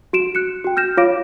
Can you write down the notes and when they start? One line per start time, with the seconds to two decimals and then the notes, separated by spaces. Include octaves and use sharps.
0.13 F#4 D7 E7
0.35 F#6 C#7
0.64 F#4 G5
0.77 F6 G6 A#6 E7
0.97 F4 C#5 F5 D6 A#6 D7